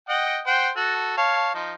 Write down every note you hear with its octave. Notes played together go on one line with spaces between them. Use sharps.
D#5 F#5 G5
C5 F#5 G5
F#4 A4
C#5 F5 A5
F3 D#4